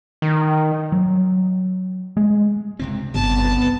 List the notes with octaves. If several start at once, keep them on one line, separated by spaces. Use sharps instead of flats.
D#3
F#3
G#3
C#2 C3 C4
G1 B3 A5